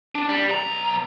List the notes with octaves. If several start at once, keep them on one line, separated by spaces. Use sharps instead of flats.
D4
G3
B1 A#5